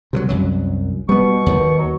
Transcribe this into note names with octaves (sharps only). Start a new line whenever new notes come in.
C3 D#3 F#3
C2 F#2 F#3
B2 G3 B3 C#6
D#2 D#3
F#3